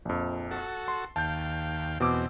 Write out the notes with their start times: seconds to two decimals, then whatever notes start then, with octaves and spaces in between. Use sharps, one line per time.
0.05 A#1 F2
0.51 F#4 A4
0.88 C6
1.16 D#2 F5 G5 A5 G6
2.00 E2 B2 C4 D6 E6